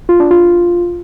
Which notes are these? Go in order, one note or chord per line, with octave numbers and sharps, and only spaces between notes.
F4
D4
F4